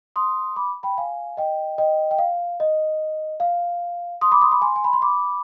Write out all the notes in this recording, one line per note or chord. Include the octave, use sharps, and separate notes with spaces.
C6 D#6
B5 D6
G5 B5
F5 G#5
D#5 G5
D#5 G5
G5
F5
D#5
F5
C6 D#6
B5 D6
C6 D#6
B5 D6
G#5 C6
G#5
B5
C6
B5 D6